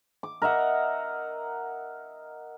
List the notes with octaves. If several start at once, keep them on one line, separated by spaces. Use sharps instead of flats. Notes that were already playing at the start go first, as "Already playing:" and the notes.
D6
A#4 D#5 E5 F#5